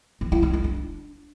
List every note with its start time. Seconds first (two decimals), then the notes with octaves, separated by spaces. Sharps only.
0.21 E3
0.32 E4
0.43 C#4
0.53 D#4
0.64 D4